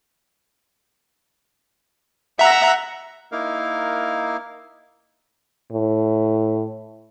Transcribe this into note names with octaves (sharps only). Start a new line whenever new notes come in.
E5 F#5 A#5
A#3 D#4 E4 A#4 F5
A2